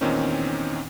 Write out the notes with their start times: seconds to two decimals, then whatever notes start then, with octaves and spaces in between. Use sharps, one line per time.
0.01 E2 A#2 D#3 C4 C#4 D#4